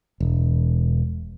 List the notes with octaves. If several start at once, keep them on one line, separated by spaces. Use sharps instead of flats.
E1